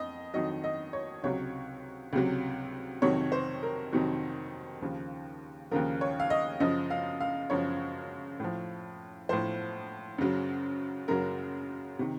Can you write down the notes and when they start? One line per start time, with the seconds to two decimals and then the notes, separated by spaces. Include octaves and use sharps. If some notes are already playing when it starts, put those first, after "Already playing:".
Already playing: F2 D#5
0.34 F2 D#3 F#3 D#5
0.64 D#5
0.93 C#5
1.24 C#2 C3 F#3 C#5
2.13 C#2 C3 F#3
3.02 F2 C3 D#3 F#3 C#5
3.32 C5
3.63 A#4
3.92 F2 C3 D#3 F#3
4.82 D#2 C#3 F3
5.71 D#2 C#3 F3 A#4
6.01 C#5
6.20 F5
6.30 D#5
6.60 F#2 C#3 F3 D#5
6.90 F5
7.20 F5
7.50 F#2 C#3 F3 C#5
8.40 A2 F3
9.29 A2 F3 C5
10.18 F#2 C#3 F#3
11.08 F#2 C#3 F#3 A#4
11.99 C3 D#3